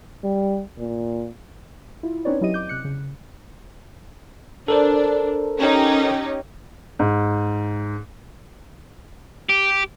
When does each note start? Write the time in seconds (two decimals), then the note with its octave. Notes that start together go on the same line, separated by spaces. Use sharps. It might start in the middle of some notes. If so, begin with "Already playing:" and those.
0.24 G3
0.78 A#2
2.03 E4 F4
2.25 C4 C#4 D#4 B4 C#5 D5
2.41 F#3 E4 G4 D#5 D#7
2.54 D6 G6
2.69 C3 F#6 C#7
2.84 C#3
4.68 D4 A4 A#4 C5
5.59 C#4 D#4 G4
6.99 G#2
9.49 G4